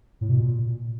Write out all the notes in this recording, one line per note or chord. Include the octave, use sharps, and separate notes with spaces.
A2
B2
A#2